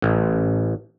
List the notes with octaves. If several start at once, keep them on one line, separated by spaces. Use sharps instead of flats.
A1